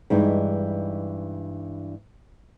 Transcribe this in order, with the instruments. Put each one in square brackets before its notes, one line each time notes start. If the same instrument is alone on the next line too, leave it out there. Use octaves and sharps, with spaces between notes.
[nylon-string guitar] G2 E3 G#3 D#4